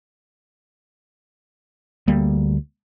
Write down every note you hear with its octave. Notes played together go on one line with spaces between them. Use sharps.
D2 G3 A#3